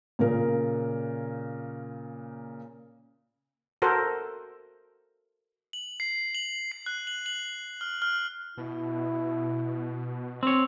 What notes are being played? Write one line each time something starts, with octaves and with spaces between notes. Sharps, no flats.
A#2 C#3 A#4
F#4 A4 A#4 C5
F#7
C7
F#7
C7
F#6
F#7
F#7
F6
F6
B2 E4
C4 C#5